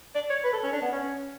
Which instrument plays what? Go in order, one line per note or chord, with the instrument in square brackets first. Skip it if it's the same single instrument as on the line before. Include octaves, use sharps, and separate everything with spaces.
[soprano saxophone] D5
C#5
B4
A4
C#4
D4
B3
C#4